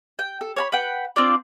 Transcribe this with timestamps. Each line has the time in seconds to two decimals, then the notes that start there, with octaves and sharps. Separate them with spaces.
0.19 G5
0.41 A4
0.56 C#5 A5 B5
0.72 B4 F#5 G5
1.16 C4 D4 F4 D5